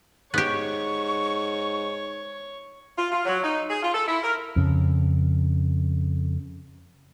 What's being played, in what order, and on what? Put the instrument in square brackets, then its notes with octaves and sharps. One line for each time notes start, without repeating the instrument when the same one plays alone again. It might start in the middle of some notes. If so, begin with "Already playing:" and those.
[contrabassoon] G#2 [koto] B3 G4 [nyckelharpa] C#5 [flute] C#6
[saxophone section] F4
F4
F#3
D#4
G#4
F4
A4
E4
A#4
[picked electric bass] F2 C#3